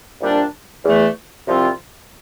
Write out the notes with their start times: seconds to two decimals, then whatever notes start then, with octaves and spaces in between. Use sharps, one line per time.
0.21 C2 A#2 G3 D4
0.84 E2 E3 A3
1.47 C2 C3 F3 C4 F4